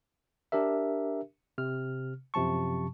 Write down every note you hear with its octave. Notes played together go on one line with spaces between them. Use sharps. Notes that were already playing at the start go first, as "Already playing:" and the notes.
D4 G4 A#4 E5
C3 F6
F#2 C3 F3 A5 C#6